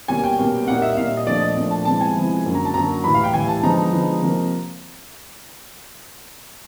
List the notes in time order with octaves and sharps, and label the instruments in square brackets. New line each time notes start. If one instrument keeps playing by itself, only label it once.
[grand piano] B2 G3 A#3 C#4 G#5
G5
B2 G3 A#3 C#4
A#2 G3 A#3 D#4 F#5
E5
A#2 G3 A#3 D#4 F5
E5
D#5
A#2 F3 A3 D4 D5
D#5
A#2 F3 A3 D4
A5
C3 F3 G#3 B3 E4 A5
G#5
C3 F3 G#3 B3 E4
F#2 D3 F#3 A#3
A#5
A5
F#2 D3 F#3 A#3 A#5
A2 E3 G3 B5
F5
G5
A2 E3 G3 G#5
A5
D3 F3 G#3 B3 D#4 A#5
D3 F3 G#3 B3 D#4
C3 F3 A#3 D#4